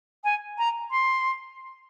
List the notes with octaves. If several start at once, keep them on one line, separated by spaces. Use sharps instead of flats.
G#5
A#5
C6